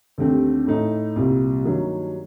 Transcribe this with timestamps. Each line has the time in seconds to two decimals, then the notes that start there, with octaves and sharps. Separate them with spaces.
0.18 D#2 D3 A3 C4 G4
0.67 A2 A3 D#4
1.16 C2 A#2 G3 C4
1.65 G2 D#3 F#3 A#3